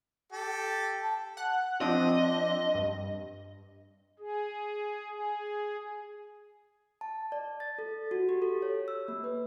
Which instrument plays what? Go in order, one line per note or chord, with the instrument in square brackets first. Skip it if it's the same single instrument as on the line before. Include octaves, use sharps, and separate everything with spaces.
[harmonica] G4 A4
[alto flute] A5
[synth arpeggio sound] F#5 F#6
[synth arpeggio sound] F3 C4 D4 [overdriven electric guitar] D#5
[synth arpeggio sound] G2
[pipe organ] G#4
G#4
[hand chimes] A5
D5
A6
A4
F#4
G4
A4
C#5
E6
A#3
B4